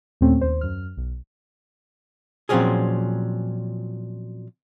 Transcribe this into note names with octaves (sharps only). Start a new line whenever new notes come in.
D#2 A#2 A3 C4 C#4
D#2 C5
F#2 F6
B1
A#2 F3 F#3 C4 C#4 G#4